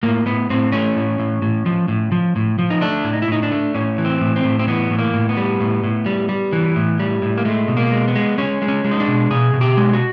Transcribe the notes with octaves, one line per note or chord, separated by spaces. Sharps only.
A2 A#3
A2 B3
A2 C4
A3 C#4
A2
A2
A2
F3
A2
F3
A2
F3
D#4
A3 D4
A2
D#4
E4
A2 D#4
D4
A3
A2 C#4
E3
C4
A2
C4
A2
C4
E3 B3
A2
A#3
A2
B3
G3
A2
A2
G3
G3
E3
A2
G3
A2
A#3
G#3 A3
B2
A#3
G#3
B3
G#3
G#3 C#4
G#3
C#4
G#3
D#4
D4
B2
B2 G#4
B2
G4
G#3
F#4